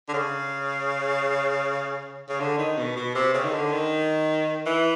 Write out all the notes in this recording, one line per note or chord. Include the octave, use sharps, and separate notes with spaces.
D3
C#3
C#3
D3
D#3
B2
B2
C3
C#3
D#3
D3
D#3
E3